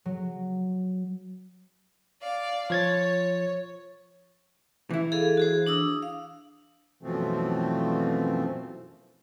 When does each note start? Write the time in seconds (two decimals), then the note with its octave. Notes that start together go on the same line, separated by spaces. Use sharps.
0.05 F#3
2.21 D5 F5
2.70 F3 C#5 G#6 A6
4.90 E3 E4
5.12 G#4 A4 F5
5.37 F#4 G#4 C5
5.66 D4 D#6 E6
6.02 F5
7.03 F#2 B2 E3 F3 A3 C4